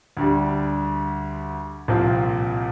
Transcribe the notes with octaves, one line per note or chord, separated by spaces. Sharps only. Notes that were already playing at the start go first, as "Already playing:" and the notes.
D2 D3 G3
C2 A#2 F3 C4